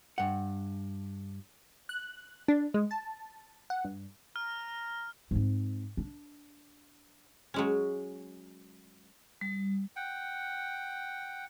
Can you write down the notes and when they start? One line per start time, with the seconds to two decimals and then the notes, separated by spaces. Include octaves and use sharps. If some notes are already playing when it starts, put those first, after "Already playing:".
0.18 G2 F#5
1.89 F#6
2.48 D4
2.74 G#3
2.91 A5
3.70 F#5
3.85 G2
4.36 A#5 F6
5.31 G#2 C4
5.97 D4
7.54 F#3 G#3 C#4
9.41 G3
9.96 F#5 G5